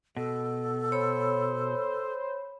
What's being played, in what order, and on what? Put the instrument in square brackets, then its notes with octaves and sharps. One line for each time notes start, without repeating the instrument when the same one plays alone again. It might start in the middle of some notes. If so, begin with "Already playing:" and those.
[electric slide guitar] B2 [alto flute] A4
[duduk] C5 [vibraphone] C#5 B5